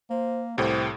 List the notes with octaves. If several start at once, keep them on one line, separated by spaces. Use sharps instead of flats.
A#3 C5
C2 A2 G4 C5